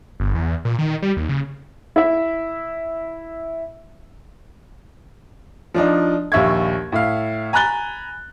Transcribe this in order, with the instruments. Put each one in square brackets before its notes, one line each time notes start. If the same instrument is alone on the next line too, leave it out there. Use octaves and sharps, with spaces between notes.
[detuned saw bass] G1
E2
A#2
D#3
G3
D#2
C#3
[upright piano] E4 E5
F3 D4 D#4
A#1 D#2 E5 C#6 G#6
A2 E4 F5
G#5 A#5 B5 F#6 A6 G7